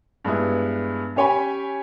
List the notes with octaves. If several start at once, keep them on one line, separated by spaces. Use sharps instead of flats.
G2 G#3 B3 E4
C#4 G4 C#5 G5 G#5 B5